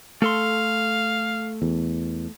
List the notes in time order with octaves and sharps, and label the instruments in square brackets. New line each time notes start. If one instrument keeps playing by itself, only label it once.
[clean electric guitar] A3 A4 C6 [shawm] F5
[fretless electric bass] E2